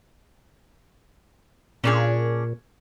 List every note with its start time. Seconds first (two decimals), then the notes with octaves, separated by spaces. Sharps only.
1.84 A#2 C#4 D4 G#4